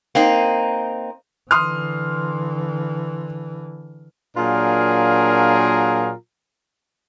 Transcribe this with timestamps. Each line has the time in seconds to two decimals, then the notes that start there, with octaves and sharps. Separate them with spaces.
0.15 A#3 C4 D#4
1.51 D3 E3 C6 D#6 F6
4.37 A#2 F#3 D4 F4 G#4 A#4